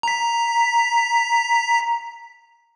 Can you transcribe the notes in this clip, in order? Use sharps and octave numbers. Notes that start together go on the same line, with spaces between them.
A#5 B6